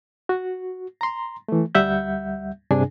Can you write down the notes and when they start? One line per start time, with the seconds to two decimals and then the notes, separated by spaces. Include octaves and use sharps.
0.29 F#4
1.01 A#5 C6
1.48 E3 A3
1.75 D2 G3 E5 F#5 G6
2.71 G2 C3 D4 G#4 G#5